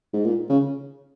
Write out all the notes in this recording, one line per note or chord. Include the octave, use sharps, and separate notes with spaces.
G#2
A#2
C#3